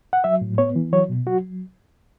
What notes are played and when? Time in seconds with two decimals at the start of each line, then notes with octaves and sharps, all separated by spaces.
0.13 F#5
0.24 F#3 E5
0.41 A2
0.58 B3 C#5
0.76 E3
0.93 F#3 C#5
1.09 B2
1.26 F#3 F#4